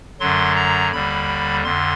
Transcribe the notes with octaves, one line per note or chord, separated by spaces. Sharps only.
F#2 D3 F#3 C6
A#5
D#2 D3 G3 B5
F2 D3 C6